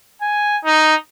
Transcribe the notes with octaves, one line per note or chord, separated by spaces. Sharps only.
G#5
D#4